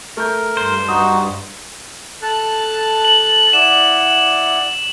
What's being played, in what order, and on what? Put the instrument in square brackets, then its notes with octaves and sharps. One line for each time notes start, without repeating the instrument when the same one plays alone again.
[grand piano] A3 G6 [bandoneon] A#4
[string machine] G2 [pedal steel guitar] C5
[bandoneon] D#4 F#4 [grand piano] D#6
[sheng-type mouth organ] A4 A5 F#6
[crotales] F#7
[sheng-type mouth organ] E4 D5 F#5 [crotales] E7